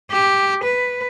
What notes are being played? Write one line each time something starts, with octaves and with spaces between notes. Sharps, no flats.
G4
B4